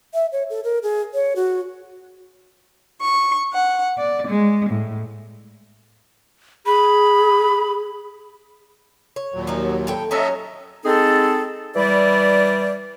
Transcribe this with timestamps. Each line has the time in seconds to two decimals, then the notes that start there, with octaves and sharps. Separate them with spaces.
0.14 E5
0.32 C#5
0.50 A4
0.64 A#4
0.83 G#4
1.14 C#5
1.36 F#4
3.01 C#6
3.54 F#5
3.98 D5
4.28 G#3
4.70 A2
6.66 G#4 B5
9.16 C#5
9.34 D#2 A#2 F#3
9.47 F3 D#4
9.87 A2 C#5 G5
10.11 F#3 C#4 A4 C#5 D#5 E5
10.85 G#3 C4 D#4 G#4 A4
11.76 E3 G3 E4 D5